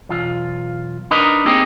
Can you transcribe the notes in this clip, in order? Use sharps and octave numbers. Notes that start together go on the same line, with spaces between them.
B1 E2 F4
D4 D#4 A#4 B4 D#5
A#3 C4 D#4 G4 G#4 D#5